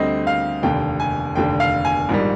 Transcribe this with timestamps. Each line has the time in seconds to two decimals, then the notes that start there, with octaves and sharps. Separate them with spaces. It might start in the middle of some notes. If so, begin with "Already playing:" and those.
Already playing: D2 D3 G3 C4 D#5
0.27 F5
0.63 F1 D#2 D3 G5
1.00 G#5
1.36 F1 D#2 D3 G5
1.60 F5
1.85 G#5
2.09 A#1 G#2 D#3 G3